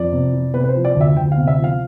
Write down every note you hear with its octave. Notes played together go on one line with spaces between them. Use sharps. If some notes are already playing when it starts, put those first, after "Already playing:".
Already playing: F2 D5
C3
E3
C3 B4
B4
C5
F3
D5
D2
E5
D2 G5
F5
C3
E5
F3
F5